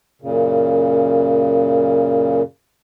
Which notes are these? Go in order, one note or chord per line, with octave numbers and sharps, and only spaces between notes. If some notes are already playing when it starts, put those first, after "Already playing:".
F#2 A#2 C#3